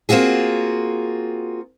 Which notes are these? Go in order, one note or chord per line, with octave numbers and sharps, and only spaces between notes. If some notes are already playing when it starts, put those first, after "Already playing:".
A#3 C4 F4 F#4 G#4